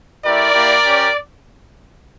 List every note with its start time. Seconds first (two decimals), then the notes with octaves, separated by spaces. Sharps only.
0.24 A3 E4 G4 A#4 D5
0.54 A#3 E4 G4
0.84 C#4 G4